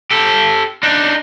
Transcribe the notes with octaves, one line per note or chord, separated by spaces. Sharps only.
G4 A4
D4 D#4